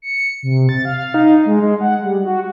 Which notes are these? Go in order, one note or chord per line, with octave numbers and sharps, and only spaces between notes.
C#7
C3
A6
F5
D#4
G#3
G#3
F#5
G3
F#4